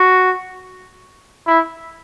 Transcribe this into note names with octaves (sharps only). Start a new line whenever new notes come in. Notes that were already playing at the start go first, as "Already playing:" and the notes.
Already playing: F#4
E4